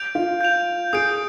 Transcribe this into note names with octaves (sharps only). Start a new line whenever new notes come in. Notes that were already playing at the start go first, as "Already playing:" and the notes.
Already playing: G6 D7 F7
F4
G6 D7 F7
G#4 D#6 G6 D7